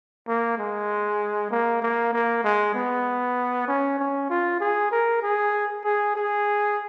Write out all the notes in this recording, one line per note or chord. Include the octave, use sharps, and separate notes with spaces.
A#3
G#3
A#3
A#3
A#3
G#3
B3
C#4
C#4
F4
G#4
A#4
G#4
G#4
G#4